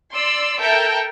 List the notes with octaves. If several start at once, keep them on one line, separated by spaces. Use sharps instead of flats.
D5 C6 E6
A4 A#4 E5 G5